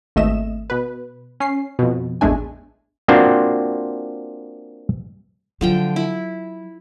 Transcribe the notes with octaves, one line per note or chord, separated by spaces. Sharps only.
G#1 D#2 A3 D#5 E5 E7
B2 B4
C#4 C7
F2 B2
A1 E2 G#3 A3 D4 G#5
A#3 C4 D4 F4 F#4 C5
D3 F3 F#3 G5
E4